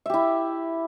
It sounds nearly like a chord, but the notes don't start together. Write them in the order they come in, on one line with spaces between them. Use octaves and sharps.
E5 G4 E4